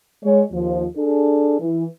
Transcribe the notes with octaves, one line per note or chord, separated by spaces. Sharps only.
G#3 C#5
D#2 F3
D4 G#4 A4
E3